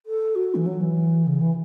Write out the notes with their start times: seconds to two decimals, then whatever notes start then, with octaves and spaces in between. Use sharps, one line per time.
0.06 A4
0.35 F#4
0.55 E3
0.66 F#3
0.81 E3
1.26 C#3
1.41 E3